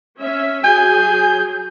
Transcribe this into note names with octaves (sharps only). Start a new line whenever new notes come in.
C#4 E5
F#3 G#4 G#5 G6